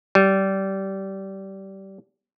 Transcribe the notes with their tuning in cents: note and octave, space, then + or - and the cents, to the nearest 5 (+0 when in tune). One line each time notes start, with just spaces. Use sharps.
G3 -20